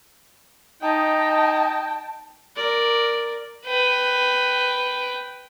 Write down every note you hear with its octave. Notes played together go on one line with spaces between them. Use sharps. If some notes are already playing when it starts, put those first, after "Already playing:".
D#4 D#5 G5 A5
A#4 D5
B4 G5